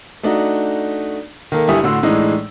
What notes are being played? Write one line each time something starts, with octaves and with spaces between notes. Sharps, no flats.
A3 D4 D#4 F#4
D#3 A#3 A4
G1 G3 E4 G4 G#5 D#6
A2 D3 F#4 C6 E6
A2 E3 G#3 D4 D#4